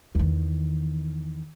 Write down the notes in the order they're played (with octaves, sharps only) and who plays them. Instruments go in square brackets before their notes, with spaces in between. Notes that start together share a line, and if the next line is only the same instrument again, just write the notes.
[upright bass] E2 D#3